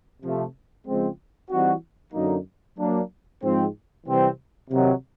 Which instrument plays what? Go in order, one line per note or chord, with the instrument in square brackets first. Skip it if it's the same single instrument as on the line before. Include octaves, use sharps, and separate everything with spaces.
[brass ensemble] C3 F3 A3
C#3 F3 G#3 C4
E3 G3 C4 D#4 F#4
F#2 D3 F#3 A#3 D#4
F#3 A#3 D4
G#2 F3 G#3 C4
C3 E3 G3 C4
C3 D#3 F#3